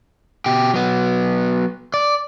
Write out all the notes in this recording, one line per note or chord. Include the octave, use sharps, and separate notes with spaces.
B2 G4
F#3 B3
D5